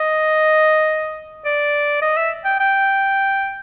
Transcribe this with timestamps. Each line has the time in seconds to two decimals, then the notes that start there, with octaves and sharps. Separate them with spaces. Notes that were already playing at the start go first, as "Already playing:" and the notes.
Already playing: D#5
1.45 D5
2.02 D#5
2.17 E5
2.45 G5
2.60 G5